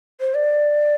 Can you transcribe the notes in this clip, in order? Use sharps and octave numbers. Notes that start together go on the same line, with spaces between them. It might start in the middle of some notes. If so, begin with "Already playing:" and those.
C5
D5